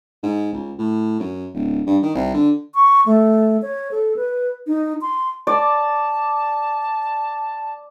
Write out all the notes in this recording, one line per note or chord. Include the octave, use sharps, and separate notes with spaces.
G#2
C#2
A2
F#2
D1
G2
D#3
C2
D3
C#6
A3
C#5
A4
B4
D#4
C6
D5 A5